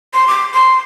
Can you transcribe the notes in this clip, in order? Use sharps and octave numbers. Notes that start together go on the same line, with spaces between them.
C6
D6
C6